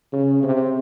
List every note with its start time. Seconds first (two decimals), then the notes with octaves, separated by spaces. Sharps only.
0.13 C#3
0.43 C3